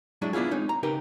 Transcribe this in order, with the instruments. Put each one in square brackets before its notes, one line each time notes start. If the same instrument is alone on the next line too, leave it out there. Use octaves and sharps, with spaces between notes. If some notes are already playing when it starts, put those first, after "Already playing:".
[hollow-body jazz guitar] F#3 G#3 D4 E4
B3 D4 E4 F4 G#4
G#3 C4 D#4 C#5
A#5
C#3 D#4 G4 A#4 B4